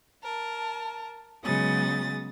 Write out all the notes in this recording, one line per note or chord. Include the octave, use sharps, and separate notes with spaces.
A#4 A5
C#3 F#3 G#3 B3 D#6 A6